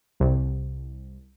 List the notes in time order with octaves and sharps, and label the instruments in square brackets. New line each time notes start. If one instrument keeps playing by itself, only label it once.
[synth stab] C2